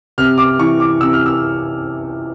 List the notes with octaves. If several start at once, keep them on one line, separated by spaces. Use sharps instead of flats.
C3 F6
D6
E3 C#6
D6
C3 E6
F6
E6